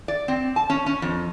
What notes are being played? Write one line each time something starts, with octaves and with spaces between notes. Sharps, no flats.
D5
C4
A5
C#4
C#4
F2